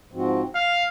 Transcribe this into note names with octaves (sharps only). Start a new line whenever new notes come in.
G#2 F3 C4 F#4
F5